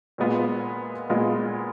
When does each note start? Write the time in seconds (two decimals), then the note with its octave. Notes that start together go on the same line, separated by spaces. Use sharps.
0.18 A#2 G#3 B3 F4
1.10 A#2 G#3 B3 F4